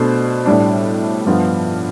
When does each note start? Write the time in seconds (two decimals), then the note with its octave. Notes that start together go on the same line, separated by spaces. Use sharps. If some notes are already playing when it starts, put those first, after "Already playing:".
Already playing: B2 A3 D4 C5
0.46 A2 G3 D4
1.26 G2 F3 B3 F4